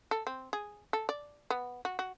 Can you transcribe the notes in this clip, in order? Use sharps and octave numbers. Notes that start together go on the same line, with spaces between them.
A4
C4
G#4
A4
D5
B3
F#4
F#4